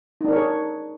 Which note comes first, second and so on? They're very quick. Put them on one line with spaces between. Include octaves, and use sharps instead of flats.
D#4 D4 A#4 C#5 G#4